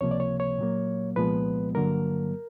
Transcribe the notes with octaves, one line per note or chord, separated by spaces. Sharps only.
C#2 C3 F3 A#3 C#5
D5
C#5
C#5
A#2 F#3 A#3
C2 A#2 F3 G#3 B3 B4
G2 D3 F#3 A#3 A#4